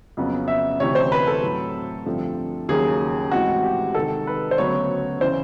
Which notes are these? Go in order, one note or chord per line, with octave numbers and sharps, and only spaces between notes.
F2 C#3 F#3 B3
E5
D2 C3 E3 C#5
C5
B4
A4
A2 F#3 A3 C4
G2 D3 F3 A3 C4
D#2 C#3 F#3 A#3 G#4
A2 E3 G#3 C4 F#4
G4
C3 D#3 G#3 A4
B4
C5
D2 C#3 F#3 B3 C#5
C#3 E3 C5